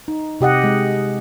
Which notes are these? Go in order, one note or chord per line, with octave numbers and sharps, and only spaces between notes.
D#4
C3 G4 D#5 F#5
G#3